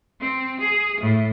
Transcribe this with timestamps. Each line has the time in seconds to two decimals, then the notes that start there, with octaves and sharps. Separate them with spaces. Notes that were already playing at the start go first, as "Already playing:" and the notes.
0.21 C4
0.60 G#4
1.00 A2